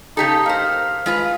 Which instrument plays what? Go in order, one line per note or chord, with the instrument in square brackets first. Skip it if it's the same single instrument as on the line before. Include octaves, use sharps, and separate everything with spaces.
[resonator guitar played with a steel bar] C#3 G4 A4 [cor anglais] D#4
[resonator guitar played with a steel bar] A#3 C5 [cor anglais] F5
[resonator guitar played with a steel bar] G#3 F4 B4